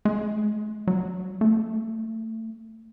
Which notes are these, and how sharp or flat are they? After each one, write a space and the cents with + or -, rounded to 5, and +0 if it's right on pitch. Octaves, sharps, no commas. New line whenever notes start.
G#3 +45
F#3 +25
A3 +25